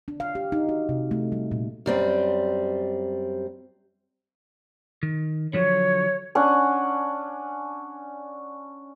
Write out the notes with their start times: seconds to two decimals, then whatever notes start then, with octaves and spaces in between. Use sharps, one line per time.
0.08 D4
0.20 F5
0.35 G4
0.52 D#4
0.69 F#4
0.89 C3
1.11 A3
1.32 G3
1.51 A#2
1.86 F#2 G3 C4
5.03 D#3
5.53 D3 F3 F#3 C#5
6.35 C#4 D4 C#5 F#5